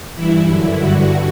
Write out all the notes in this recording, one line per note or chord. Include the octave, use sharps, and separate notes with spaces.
G2 E3 E4
F#2 D3
G2 D3 F#4